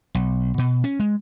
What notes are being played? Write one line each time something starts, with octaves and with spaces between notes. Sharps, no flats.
B1
B2
C#4
G#3